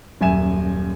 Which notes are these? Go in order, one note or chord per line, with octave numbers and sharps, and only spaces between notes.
D#1 F#2 E5 G#5 E7